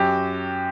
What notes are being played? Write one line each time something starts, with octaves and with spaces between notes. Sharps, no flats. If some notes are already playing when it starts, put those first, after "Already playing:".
Already playing: F#2 F#3 G4